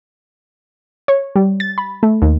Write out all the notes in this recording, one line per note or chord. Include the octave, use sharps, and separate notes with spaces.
C#5
G3
A6
B5
A3
D#2